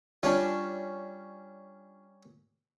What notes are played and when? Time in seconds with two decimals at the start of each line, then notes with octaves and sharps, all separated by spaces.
0.23 G3 C#4 D4 F4